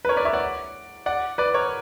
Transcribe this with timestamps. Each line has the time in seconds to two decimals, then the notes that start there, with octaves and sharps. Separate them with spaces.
0.05 B4
0.09 A#4 C#5
0.17 B4 D5
0.25 C#5 E5
0.33 D5 F#5
1.06 D5 F#5
1.38 B4 D5
1.54 A#4 C#5